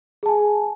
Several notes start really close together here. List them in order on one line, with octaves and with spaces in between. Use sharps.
G#4 A5 G#5